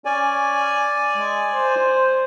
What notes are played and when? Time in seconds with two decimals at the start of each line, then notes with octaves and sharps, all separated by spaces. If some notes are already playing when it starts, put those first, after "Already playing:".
0.05 C#4 D5 G#5
1.17 G#3
1.54 C5